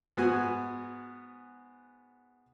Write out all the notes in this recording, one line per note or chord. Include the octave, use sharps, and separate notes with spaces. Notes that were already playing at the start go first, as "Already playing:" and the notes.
G#2 B3 F#4 G#5